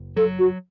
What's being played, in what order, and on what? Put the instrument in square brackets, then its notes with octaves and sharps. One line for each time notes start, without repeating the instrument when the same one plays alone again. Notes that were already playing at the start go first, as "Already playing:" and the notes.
Already playing: [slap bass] F#1
[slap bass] F#3 [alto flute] A4
[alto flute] F#4